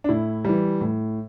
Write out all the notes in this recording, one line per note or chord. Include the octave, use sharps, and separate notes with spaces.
D4
A2 E4
E3 G3
A2